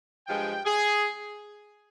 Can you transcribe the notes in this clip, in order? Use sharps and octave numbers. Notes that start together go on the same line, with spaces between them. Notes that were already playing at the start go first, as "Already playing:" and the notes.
G2 F3 G#3 G5
G#4